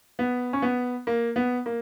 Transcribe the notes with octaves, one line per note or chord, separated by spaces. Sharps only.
B3
C#4
B3
A#3
B3
A#3